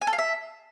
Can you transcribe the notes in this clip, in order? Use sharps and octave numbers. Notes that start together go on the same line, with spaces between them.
G#5
A4
F5
E5